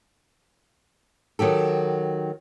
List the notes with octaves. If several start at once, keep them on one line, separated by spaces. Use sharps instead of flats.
D#3 F#3 G4 A4